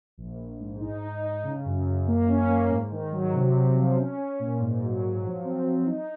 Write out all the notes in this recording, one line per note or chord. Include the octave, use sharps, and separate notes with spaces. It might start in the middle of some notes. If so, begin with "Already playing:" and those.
A#1
A#1
G#2
D#4
D#4
D#4
C#3
F#2
F#2
A#3
C#4
A#3
G#2
D#3
F#3
C3
C3
F3
C#4
C#4
A#2
G#2
F#3
F#3
F3
C4
C4
D#4